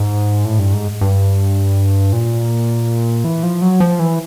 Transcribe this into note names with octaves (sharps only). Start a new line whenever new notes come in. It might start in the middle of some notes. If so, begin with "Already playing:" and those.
Already playing: G#2
A2
G2
G#2
G2
A#2
E3
F3
F#3
F3
E3